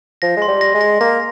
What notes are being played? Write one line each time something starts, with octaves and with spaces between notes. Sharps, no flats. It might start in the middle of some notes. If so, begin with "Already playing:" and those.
F3 A#6
G#3
C6
G3
A#6
G#3
A#6
A#3 A#6